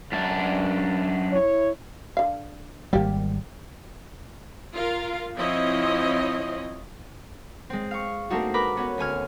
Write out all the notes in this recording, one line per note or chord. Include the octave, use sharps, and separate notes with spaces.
F#2 D4
E4 C#5
D3 F5
G#1 G3 A#3 G4
F4 A#4 F5
F3 C4 E4 C#5 D#5
G#3 C4
F5 C#6
A3 A#3 C4 D4 D#4 F#4
A#4 B4 B5 D6 F#6 A#6
B3 C#4 F#4
D2 C#4 G#5 F6